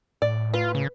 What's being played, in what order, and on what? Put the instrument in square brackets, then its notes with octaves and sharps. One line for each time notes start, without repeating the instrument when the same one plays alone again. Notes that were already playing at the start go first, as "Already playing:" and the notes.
[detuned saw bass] A2 [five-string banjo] D5
[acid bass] F4 [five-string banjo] B4
[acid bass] C#3